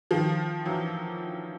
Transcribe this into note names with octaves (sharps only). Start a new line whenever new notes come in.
D#3 F3
E3 F#3